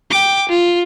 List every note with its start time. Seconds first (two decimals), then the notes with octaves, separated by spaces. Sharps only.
0.11 G5 D6
0.49 F4